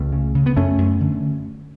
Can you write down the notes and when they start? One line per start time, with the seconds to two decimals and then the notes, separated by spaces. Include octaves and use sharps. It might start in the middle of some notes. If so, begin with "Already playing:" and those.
Already playing: C#2 A3 C#4
0.12 C#3
0.35 C#3
0.46 B3
0.56 F#2 A3 C#4
0.78 F#2
1.00 D3